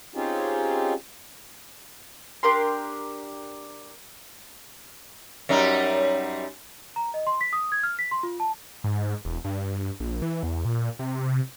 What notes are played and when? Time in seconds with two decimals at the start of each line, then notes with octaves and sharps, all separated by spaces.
0.15 C4 C#4 D#4 F4 G4 G#4
2.43 D4 G4 A#4 C6
5.49 F#2 G3 D#4
6.96 A#5
7.14 D#5
7.27 C6
7.41 B6
7.53 D#6
7.72 G#6
7.83 F6
7.99 B6
8.11 C6
8.23 F4
8.40 A5
8.84 G#2
9.25 E1
9.44 G2
10.00 A#1
10.22 E3
10.43 E2
10.65 A#2
10.99 C3